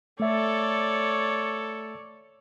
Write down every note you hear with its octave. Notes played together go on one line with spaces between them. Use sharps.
A3 A4 C#5 D5 E5